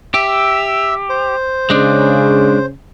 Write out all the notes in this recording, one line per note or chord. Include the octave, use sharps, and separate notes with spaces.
G4 E5 E6
C5
C#3 G#3 D4